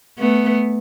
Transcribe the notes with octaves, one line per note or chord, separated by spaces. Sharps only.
A3 B3